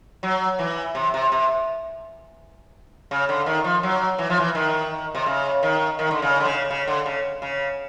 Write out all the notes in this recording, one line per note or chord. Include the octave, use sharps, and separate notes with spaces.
F#3
E3
C3
C3
C3
C#3
D3
D#3
F3
F#3
E3
F3
E3
D#3
C3
C#3
D#3
D#3
D3
C#3
D3
C#3
C#3
D3
C#3
C#3